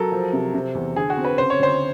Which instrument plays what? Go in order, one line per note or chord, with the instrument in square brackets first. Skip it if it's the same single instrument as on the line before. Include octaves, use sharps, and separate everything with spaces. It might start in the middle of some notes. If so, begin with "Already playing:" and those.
Already playing: [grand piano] F#3 [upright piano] A4 A#4
[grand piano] F3
C3
C3
E2
[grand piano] D3 [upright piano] G#4
[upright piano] F#4
[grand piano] C4
[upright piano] B4
[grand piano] C#3 [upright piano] C5
[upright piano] C#5
[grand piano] D2 [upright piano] C5